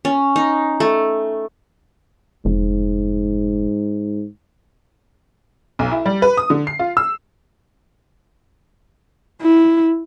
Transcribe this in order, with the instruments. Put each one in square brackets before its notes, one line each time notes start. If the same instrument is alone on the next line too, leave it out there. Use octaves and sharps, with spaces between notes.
[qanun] C#4
D#4
A3
[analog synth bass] F1 [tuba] G#2
[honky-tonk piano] B1
E4
G3
B4
D#6
D3
C7
F4
E6
[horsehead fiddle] E4